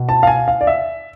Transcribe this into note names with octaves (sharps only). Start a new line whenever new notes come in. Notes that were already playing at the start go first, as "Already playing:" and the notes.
Already playing: B2
A5
F5
G#5
F5
D5
E5